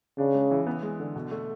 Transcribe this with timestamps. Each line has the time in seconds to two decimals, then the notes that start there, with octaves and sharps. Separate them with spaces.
0.18 C#3 D4
0.35 G#3
0.51 E3
0.67 B3
0.83 G#3
1.00 D3
1.16 B2
1.31 A3